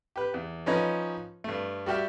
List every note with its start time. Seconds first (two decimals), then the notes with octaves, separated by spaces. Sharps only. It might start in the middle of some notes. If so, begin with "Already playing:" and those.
0.16 G4 B4
0.34 E2
0.66 F3 C#4 D#4 B4 C#5 D#5
1.44 G2 A3
1.86 G3 F#4 G4 E5 F6